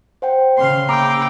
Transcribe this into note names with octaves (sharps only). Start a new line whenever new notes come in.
C5 F#5 G5
C#3 F5 C6
A#3 G5 A#5 B5 D6 E6